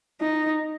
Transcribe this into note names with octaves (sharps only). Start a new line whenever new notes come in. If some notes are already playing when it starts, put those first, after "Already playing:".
D#4